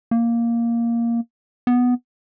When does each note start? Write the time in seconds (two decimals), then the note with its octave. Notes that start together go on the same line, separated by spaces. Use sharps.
0.11 A#3
1.67 B3